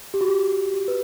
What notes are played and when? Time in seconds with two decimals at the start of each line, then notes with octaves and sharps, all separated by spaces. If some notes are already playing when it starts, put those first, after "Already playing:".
0.14 G4
0.21 F#4
0.28 G4
0.73 G4
0.88 B4